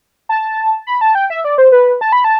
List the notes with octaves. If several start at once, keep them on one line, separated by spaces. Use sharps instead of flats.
A5
B5
A5
G5
E5
D5
C5
B4
A5
B5
A5